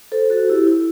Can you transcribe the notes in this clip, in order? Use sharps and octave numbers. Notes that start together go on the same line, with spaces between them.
A4 C5
F#4 A4
E4 G4
E4